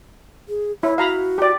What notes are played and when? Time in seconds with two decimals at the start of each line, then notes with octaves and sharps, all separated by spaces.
0.49 G#4
0.83 E4 C#5
0.98 F#4 F5 A#5 B5
1.38 G4 D5